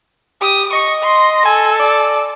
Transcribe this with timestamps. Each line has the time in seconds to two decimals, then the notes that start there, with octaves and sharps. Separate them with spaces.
0.41 G4 D#6
0.73 D#5 C#6
1.03 C6
1.45 A4 G#5
1.80 D5